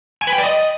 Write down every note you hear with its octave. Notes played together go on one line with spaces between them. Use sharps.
G#5
B4
G5
D5
D#5